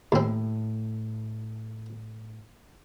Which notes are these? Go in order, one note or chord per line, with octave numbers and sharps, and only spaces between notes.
D#2 A2 C4